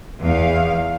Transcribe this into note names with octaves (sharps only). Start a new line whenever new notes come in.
E2 F5